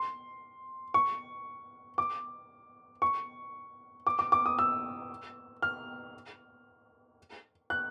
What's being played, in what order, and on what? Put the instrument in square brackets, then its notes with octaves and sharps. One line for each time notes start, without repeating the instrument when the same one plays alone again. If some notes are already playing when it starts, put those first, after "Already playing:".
Already playing: [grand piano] C6
C#6
D6
C#6
D6
D6
D6
D#6
E6
F6
F#6